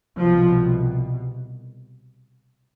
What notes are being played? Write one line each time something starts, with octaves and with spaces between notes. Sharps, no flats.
C2 B2 F3